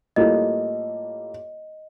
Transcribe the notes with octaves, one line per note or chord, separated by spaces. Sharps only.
A2 G3 A#3 F4 A4 D#5